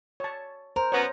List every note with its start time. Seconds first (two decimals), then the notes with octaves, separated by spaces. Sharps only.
0.20 C#5 A5
0.76 A#4 C5
0.92 F#2 B3 C#5 A#5